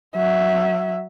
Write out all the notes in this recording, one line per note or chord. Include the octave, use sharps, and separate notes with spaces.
F#3 E5